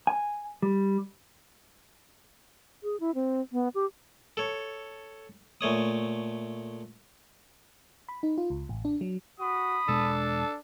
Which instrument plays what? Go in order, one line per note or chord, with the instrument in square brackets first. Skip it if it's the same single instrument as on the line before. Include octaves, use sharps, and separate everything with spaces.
[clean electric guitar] G#5
G3
[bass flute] G#4
E4
C4
B3
G4
[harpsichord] A4 C#5
A#2 A3 C#5 D#6
[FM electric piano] B5
D#4
F4
C#2
A1
D4
F#3
[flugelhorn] F#4 [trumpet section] B5 D#6
[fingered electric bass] E1 B2 G#3 [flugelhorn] D4 [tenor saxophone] A4